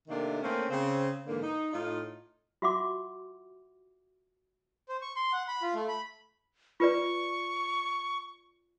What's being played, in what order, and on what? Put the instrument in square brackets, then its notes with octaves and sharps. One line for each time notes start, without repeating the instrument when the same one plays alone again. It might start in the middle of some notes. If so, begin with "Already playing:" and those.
[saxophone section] C3 D#3 A3 A#3 D4
A3 A#3 C4 C#4
C#3 C4
G#2 D3 E3 A#3
D#4
A2 D#4 F4
[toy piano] F4 F#4 E5 F#5 C6 D6
[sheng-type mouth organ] C5
C#6
C6
F#5
B5
F4
A3
B5
[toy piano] F4 B4 D5 [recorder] C#6